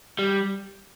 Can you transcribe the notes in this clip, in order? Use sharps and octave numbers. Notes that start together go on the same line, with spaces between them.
G3